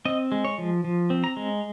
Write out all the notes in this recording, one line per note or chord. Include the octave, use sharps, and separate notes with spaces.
C4 D#5
G#3
C#5
F3
F3
C4
A#5
G#3